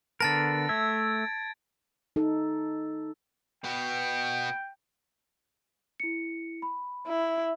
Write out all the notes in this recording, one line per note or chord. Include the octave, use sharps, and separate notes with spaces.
D3 B3 A#4 A5 A6 A#6 D7
A3 E5 G#6
D#4 A4
B2 B3 G5
E4 C#7
B5
E4